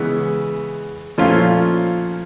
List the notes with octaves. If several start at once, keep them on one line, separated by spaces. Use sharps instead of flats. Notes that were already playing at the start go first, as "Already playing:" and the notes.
Already playing: C#3 E3 G#3 B3
A#2 F3 A3 C#4 F4